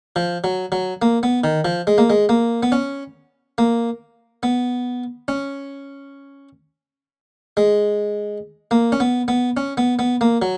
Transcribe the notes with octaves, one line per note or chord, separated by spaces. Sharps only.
F3
F#3
F#3
A#3
B3
D#3
F3
G#3
A#3
G#3
A#3
B3
C#4
A#3
B3
C#4
G#3
A#3
C#4
B3
B3
C#4
B3
B3
A#3
F#3